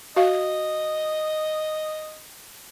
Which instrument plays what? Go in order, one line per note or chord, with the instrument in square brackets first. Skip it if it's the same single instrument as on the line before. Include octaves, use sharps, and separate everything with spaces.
[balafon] F#4 F5 [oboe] D#5